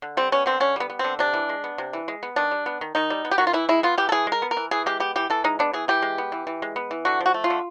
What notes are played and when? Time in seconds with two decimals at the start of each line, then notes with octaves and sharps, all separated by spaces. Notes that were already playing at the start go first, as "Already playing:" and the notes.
0.02 D3
0.17 G3 C4
0.32 B3 C#4
0.46 D3 C4
0.60 D3 C#4
0.76 G3 B3
0.90 B3
0.99 D3 C4
1.19 C3 D4
1.34 E3
1.49 G#3
1.64 B3
1.78 C3
1.93 E3
2.08 G#3
2.23 B3
2.36 D#3 D4
2.51 G3
2.66 B3
2.81 D#3
2.95 D#3 D#4
3.10 G3
3.25 B3
3.31 G4
3.38 D#3 F#4
3.47 F4
3.53 E3 E4
3.69 G#3 E4
3.83 B3 F4
3.97 E3 G4
4.09 A4
4.12 E3 G#4
4.27 G#3
4.32 A#4
4.42 B3
4.51 A#4
4.57 E3
4.71 E3 G#4
4.86 G#3 G4
5.00 B3 G4
5.16 E3 G4
5.30 E3 A4
5.44 G#3 D#4
5.59 B3 D4
5.73 E3 G#4
5.88 E3 G4
6.02 G#3
6.18 B3
6.32 E3
6.47 E3
6.62 G#3
6.76 B3
6.91 E3
7.05 D3 F#4
7.21 F3
7.26 F#4
7.34 A3
7.44 F4
7.50 D3